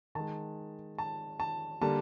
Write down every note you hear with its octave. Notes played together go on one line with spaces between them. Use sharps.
D#3 G#3 A5
A5
A5
D3 G3 A#3 A5